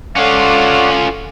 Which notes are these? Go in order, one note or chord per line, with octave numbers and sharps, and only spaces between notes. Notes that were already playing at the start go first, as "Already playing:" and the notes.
C#4 F4 A4 C#5 D5 F5 F#5